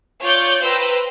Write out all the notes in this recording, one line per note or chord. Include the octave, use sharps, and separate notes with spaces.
F4 C#5 D5 G6
B4 C5 G5 A#5 E6